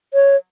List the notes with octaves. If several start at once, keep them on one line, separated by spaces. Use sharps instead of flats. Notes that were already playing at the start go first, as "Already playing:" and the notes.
C#5